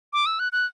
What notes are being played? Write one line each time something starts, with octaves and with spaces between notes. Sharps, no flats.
D6
E6
F#6
F#6